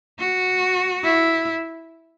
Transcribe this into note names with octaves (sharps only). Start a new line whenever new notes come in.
F#4
E4